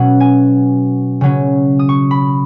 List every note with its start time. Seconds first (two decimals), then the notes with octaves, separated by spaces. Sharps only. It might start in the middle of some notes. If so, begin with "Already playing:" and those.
Already playing: B2 F#3 C#4 F#5
0.20 G#5
1.21 C#3 F#3 C#4
1.79 D#6
1.89 C#6
2.11 B5